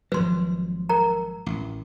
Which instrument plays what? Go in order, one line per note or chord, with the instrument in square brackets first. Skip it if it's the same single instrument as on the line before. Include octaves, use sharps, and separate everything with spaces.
[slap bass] G#1 F3 F#3 [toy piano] B4 C6
[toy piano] A#4 A#5
[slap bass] A1